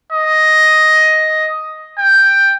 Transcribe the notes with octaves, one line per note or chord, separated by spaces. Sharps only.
D#5
G5